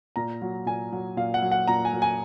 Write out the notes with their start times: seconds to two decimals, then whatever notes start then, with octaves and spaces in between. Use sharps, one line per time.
0.16 A#2 A#5
0.42 F#3
0.66 A#2 G#5
0.92 F#3
1.17 A#2 F5
1.34 F#5
1.42 F#3
1.52 F#5
1.67 A#2 A#5
1.85 G#5
1.93 F#3
2.02 G#5